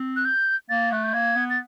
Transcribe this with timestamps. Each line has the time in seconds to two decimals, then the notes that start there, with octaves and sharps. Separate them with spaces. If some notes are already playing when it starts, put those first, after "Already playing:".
Already playing: C4
0.16 F#6
0.25 G6
0.69 A#3 A6
0.92 A3 F#6
1.04 G6
1.14 A#3 G#6
1.36 B3
1.50 A6